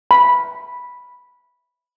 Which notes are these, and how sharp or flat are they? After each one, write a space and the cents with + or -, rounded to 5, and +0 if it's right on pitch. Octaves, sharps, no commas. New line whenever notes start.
B5 -5